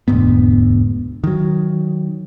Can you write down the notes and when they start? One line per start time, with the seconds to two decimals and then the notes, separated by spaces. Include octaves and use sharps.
0.08 E1 D2 G#2 B3
1.24 D#3 F#3